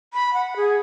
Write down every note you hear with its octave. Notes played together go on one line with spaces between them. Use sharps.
B5
F#5
G#4